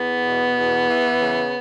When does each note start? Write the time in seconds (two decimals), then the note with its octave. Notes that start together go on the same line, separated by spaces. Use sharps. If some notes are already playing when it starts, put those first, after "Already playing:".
Already playing: E2 B3
0.23 B2
0.55 E2
0.88 E3
1.20 C#3